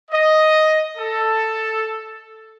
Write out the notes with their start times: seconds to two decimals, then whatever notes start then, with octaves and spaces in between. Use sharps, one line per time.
0.11 D#5
0.97 A4